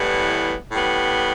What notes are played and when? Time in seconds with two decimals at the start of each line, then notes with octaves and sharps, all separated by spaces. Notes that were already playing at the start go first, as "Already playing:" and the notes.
Already playing: A2 E3 G3 B3
0.71 A2 G3 B3